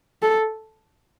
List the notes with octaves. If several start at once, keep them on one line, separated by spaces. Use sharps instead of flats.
A4